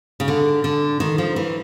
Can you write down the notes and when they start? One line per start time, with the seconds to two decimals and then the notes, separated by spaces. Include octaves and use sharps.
0.20 C#3
0.28 D3
0.64 D3
1.00 D#3
1.18 F3
1.36 E3